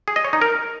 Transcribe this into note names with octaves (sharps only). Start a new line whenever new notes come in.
G#4
D#5
C#5
D#4
A#4